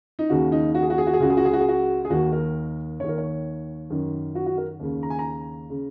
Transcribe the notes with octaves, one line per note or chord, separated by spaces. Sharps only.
D#4
D#2 C#3 F#4
D#4
F#4
G#4
F#4
G#4
F#4
G#4
C#2 C#3 F#4
G#4
F#4
G#4
F#4
G#4
F#4
G#4
D#2 D#3 F#4
A#4
D#2 D#3 A#4 C#5
C#5
F#2 D#3
F#4
F#4
A#4
D#2 C#3
A#5
G#5
A#5
C#3